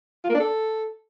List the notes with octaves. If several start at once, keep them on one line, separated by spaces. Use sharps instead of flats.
F4
A#3
D4
A4